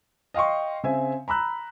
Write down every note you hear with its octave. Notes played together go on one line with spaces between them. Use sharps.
D#5 F5 G5 C6 C#6
C#3 C4 E5 G#5
A#5 B5 E6 F#6